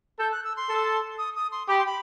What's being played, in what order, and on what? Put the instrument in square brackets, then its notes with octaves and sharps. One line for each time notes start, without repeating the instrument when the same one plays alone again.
[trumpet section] A4 [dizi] G6
[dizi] F#6
E6
C6
[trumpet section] A4
[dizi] D#6
D#6
C6
[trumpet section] G4 [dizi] B5
[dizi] C6
B5